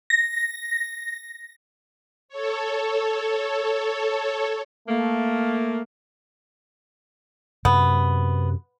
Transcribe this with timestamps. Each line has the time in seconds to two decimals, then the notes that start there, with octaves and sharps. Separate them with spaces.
0.10 A#6
2.29 A4 C#5
4.88 A3 A#3
7.65 F#2 C3 B3